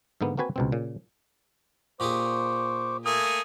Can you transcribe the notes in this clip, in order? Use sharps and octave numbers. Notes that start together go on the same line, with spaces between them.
G#2 D3 A#3 B3
A#3 C4 F#4 B4 G#5
C#2 B2 C4
A#2 C#3
A#2 G4 G#4 C5 C#6 D6
A3 A#3 G#5 D#6